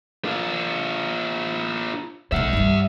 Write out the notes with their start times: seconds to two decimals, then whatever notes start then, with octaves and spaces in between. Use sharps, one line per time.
0.25 D4 F4
2.32 B1 G#3 E5 F#5
2.53 G2 G3